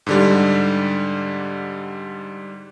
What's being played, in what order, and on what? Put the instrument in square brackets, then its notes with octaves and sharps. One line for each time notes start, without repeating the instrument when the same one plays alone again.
[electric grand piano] G#2 D3 G3